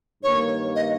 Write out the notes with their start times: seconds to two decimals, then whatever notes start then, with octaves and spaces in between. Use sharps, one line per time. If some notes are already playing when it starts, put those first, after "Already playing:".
0.23 G2 D#3 A#3 C#5
0.76 D#5